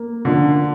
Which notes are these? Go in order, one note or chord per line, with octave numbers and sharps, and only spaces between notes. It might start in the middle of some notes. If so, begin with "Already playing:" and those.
Already playing: A#3
D3 F3 D4 F4